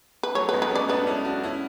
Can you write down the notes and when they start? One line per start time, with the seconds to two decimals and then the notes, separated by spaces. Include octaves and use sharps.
0.23 B4
0.35 F#3 A3 C#5
0.49 B4
0.53 G#3 B3
0.62 B4
0.71 A3 C#4 D5
0.89 B3 D4 B4
1.00 D4
1.07 C#4 E4
1.25 D4 F#4
1.43 C#4 E4